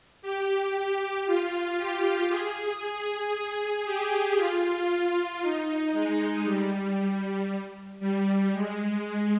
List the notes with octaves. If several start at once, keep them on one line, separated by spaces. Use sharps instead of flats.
G4
F4
G4
G#4
G#4
G4
F4
D#4
G#3
G3
G3
G#3